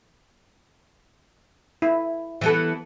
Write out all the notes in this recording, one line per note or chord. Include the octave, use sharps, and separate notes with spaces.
E4
E3 B3 A4